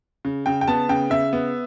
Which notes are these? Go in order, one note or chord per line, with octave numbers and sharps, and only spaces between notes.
C#3
C#3 G5
G5
B3 A5
C#3 G5
C#3 E5
B3